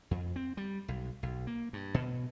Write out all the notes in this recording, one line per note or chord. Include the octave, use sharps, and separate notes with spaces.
F2
C4
G3
B1
B1
A#3
G2
B2